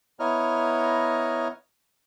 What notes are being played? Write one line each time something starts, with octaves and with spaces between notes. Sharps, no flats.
B3 E4 C#5 D#5 A#5 F6